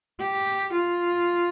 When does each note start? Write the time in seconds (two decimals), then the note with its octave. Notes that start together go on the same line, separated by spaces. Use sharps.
0.20 G4
0.73 F4